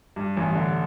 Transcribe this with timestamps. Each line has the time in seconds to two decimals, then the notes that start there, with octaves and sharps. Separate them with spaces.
0.16 G2
0.37 A1
0.55 D3